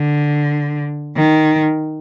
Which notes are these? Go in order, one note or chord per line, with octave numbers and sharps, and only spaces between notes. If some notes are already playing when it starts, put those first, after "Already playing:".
Already playing: D3
D#3